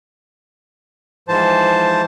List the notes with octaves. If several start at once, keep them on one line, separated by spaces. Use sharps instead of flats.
G#2 E3 F3 C5 A5